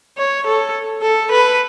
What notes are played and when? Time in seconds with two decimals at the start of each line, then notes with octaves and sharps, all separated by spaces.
0.18 C#5
0.46 A4
1.02 A4
1.31 B4